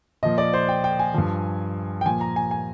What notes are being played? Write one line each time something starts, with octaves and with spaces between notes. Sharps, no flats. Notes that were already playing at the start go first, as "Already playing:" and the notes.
A#2 F3 D#5
D5
C5
G5
G5
G#5
G2 F3
G5
A#2 F3 G#5
A#5
G#5
G#5